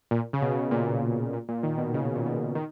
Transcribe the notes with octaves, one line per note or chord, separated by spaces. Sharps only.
A#2
C#3
B2
A#2
A#2
A#2
D#3
B2
C#3
B2
A#2
B2
D#3